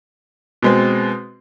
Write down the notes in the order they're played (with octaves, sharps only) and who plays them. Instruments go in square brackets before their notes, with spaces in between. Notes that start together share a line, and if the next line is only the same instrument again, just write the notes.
[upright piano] B2 G#3 C4